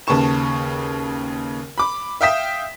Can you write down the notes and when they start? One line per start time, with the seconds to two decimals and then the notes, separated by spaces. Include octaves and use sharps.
0.07 D#2 C#3 B4 A5 C#6 E7
1.78 B5 D6
2.21 E5 F5 G5 D#6 B6 E7